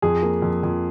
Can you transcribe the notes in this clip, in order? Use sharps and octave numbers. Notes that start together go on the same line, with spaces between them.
F2 G#4
A#3
F2
F2